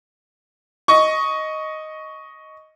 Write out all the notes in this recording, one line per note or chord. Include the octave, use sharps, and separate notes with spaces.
D#5 C#6